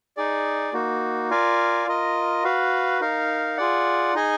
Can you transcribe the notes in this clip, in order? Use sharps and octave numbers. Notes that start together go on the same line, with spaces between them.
D#4 G#4 D5
A#3 D#4 F#4
F4 A#4 D5 F5 G#5
F4 A#4 D#5
F#4 B4 F5
D#4 A#4 F5
F4 G#4 D5 F#5
D#4 G#4 D#5 G#5